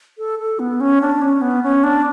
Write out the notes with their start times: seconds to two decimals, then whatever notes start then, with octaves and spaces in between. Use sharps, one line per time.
0.18 A4
0.39 A4
0.59 B3
0.80 C#4
1.01 D4
1.21 C#4
1.41 B3
1.63 C#4
1.83 D4